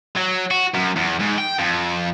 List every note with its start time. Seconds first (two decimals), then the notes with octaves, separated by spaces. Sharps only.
0.17 F#3
0.51 F#4
0.75 F#2
0.97 E2
1.20 G#2
1.38 G5
1.59 F2